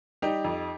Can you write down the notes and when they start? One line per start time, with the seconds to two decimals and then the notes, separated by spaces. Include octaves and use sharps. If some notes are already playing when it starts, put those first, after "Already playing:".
0.22 G3 D#4 G4
0.44 F2